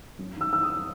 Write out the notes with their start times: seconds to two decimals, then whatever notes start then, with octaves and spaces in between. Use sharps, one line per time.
0.18 F#2
0.36 D#3 E6
0.53 D#3 E6
0.63 D#6
0.69 D#3